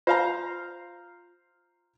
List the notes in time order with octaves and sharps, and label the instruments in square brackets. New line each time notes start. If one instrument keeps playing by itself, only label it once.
[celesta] F4 [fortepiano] C5 F5 A#5